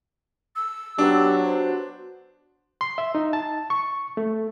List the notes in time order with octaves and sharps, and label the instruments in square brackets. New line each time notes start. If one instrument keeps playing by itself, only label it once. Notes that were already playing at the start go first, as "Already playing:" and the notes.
[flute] E6
[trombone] F#3 [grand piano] B3 D4 [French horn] G4
[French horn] F#4 [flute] C5
[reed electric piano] C6
E5
D#4
A5
C#6
A3